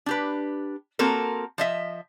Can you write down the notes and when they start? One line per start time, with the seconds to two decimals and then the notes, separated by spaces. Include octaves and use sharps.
0.06 D4 G4 B4
0.99 A#3 C4 F#4 A4 A#4
1.58 F3 D#5 E5